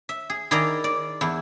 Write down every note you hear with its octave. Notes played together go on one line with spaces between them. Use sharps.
E5
G#4
D#3 E4 G#4 D5 D#5 A#5
D5
E2 E4